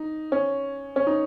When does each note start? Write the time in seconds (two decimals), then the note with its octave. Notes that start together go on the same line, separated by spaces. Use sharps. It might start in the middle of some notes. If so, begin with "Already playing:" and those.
Already playing: D#4
0.32 C#4
0.96 C#4
1.07 D#4